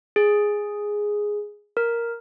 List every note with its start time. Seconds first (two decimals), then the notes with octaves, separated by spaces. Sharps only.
0.16 G#4
1.77 A#4